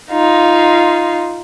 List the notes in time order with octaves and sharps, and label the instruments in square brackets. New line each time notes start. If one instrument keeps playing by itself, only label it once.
[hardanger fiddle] D#4 F4